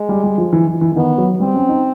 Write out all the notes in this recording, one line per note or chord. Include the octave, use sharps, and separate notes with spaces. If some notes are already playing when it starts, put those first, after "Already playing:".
Already playing: G#3
G3
G3
F3
E3
E3
E3
E3
D#3 B3
F#3
G3 C4
C#4
D#4